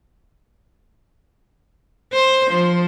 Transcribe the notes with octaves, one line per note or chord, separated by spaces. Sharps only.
C5
F3